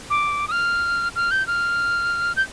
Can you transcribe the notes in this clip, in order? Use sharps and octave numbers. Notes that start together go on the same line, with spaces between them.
D6
D#6
F6
F6
G6
F6
G6